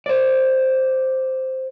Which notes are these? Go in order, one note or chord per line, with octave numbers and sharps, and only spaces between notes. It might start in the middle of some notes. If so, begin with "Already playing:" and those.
C5 D5